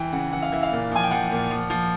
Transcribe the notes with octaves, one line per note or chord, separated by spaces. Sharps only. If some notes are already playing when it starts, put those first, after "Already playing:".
Already playing: E3 G5
C#3 F#5
E3 F#5
F5
E3 E5
F5
A#2
F3 G#5
G5
F3 F#5
A#2
F3
F3